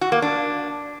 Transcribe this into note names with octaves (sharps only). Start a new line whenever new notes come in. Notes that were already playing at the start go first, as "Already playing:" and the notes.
F#4
A#3
D4